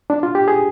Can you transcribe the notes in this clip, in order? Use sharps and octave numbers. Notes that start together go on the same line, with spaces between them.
D4
F4
G4
G#4